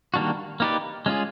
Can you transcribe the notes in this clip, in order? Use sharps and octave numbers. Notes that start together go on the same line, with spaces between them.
D#3 G3 A#3 D4 F#4
A#3 D#4 G4 B4 D5
G#3 C#4 F4 G#4